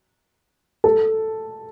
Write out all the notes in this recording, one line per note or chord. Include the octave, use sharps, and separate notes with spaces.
A4